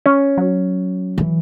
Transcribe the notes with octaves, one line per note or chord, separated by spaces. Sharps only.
C#4
F#3
E3